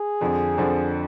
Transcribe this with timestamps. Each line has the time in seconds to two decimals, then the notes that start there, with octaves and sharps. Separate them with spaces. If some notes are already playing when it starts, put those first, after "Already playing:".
Already playing: G#4
0.21 F2 D3 F3
0.57 F2 D3 F3